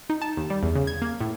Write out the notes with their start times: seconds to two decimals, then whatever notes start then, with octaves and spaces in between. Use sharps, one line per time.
0.10 D#4
0.22 A5
0.37 D#2
0.50 G3
0.63 E2
0.76 C#3
0.87 G#6
1.02 A#3
1.21 A2